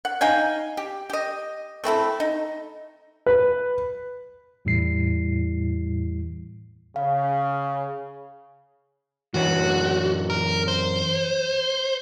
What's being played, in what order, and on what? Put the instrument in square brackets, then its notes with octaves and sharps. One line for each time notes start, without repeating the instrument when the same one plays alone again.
[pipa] F#5
D#4 F5 G5 G#5
G4
G4 D#5
A3 C4 E4 A4
D#4
[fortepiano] B4
[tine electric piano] E2 A2 E3 G3 E4 C7
[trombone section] C#3 [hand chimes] F5
[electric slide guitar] F#2 E3 C#5 [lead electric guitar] F#4
[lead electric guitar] A#4
C5